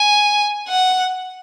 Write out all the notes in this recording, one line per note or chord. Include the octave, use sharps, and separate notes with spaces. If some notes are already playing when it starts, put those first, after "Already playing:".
Already playing: G#5
F#5